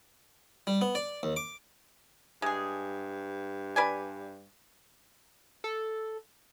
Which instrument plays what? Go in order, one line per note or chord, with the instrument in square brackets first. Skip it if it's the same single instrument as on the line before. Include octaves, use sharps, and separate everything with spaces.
[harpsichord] G3
B3
D5
D#2
D6
[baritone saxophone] G2 [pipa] G#3 G#4
[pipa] B4 D5 G#5
[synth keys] A4